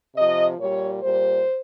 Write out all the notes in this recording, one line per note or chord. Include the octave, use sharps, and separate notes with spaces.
C3 F3 D#5
A#2 G3 C#5
A#2 G3 C5